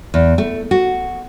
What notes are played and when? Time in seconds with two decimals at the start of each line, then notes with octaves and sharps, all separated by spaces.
0.14 E2
0.38 A3
0.71 F#4